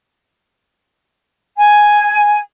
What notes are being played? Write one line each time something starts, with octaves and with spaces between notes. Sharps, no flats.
G#5